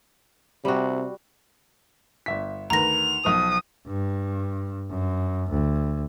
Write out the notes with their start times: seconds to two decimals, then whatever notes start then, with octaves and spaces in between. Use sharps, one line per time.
0.65 C3 G3 F#4
2.26 G1 E5 B6
2.70 D2 D#3 B4 A#5 A#6 F7
3.25 B1 F3 D#6
3.87 G2
4.90 F#2
5.50 D2